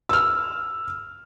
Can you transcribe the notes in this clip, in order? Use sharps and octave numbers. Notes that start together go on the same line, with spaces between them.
E6 F6